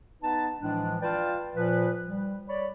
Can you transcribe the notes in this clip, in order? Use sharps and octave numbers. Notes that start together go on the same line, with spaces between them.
B3 D#4 B4 A5
A2 E3 F3 G#3 D4
F4 B4 D5 F5 G5 A5
A#2 F3 B4
G3
C#5 D5 B5